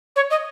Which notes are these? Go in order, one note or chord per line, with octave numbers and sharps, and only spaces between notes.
C#5
D#5